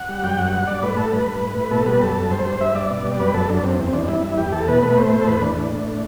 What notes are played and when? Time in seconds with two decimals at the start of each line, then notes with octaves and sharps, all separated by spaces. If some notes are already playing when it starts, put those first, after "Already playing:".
Already playing: F#5
0.09 G3
0.23 F#2 G5
0.38 F#2 F#5
0.53 G2 F#5
0.67 G2 D5
0.83 A2 B4
0.97 A2 A4
1.12 G2 B4
1.27 G2
1.41 A2
1.56 A2
1.71 B2 A4
1.86 G3 B4
2.01 F#2 A4
2.17 F#2
2.31 G2 C5
2.45 G2 C5
2.61 G2 E5
2.75 G2 D5
2.90 B2
3.05 G3
3.19 F#2 B4
3.34 F#2 A4
3.49 F#2 D4
3.63 F#2 C4
3.79 E2 C4
3.93 E2 D4
4.03 D4
4.08 G2 E4
4.23 G2
4.38 E2 G4
4.52 E2 A4
4.68 B2 B4
4.83 A3 B4
4.98 A2 C5
5.13 A2
5.21 A4
5.27 E2 B4
5.42 E2 D4
5.57 A2
5.72 A2